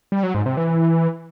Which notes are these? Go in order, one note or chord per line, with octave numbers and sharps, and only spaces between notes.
G3
F#3
G#2
C3
E3